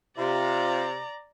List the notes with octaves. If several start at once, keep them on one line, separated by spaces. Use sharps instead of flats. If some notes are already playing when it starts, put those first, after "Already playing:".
C3 F4 D5 A#5